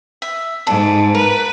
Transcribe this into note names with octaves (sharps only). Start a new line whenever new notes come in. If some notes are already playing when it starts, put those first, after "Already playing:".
E5
G#2 A4 D5
A#4 B4